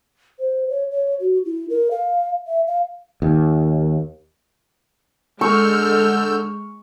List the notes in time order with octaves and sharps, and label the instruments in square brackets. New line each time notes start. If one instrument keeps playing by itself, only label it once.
[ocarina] C5
C#5
C#5
F#4
E4
A#4
F5
E5
F5
[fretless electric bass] D#2
[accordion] D3 E6 G6 [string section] G#3 F6 [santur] C#6